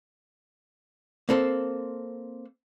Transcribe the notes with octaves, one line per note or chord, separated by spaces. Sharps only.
A#3 C4 A4 C5